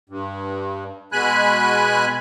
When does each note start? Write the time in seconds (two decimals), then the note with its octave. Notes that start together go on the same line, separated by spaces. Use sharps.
0.10 G2
1.12 B2 G#3 G#5 B5 F#6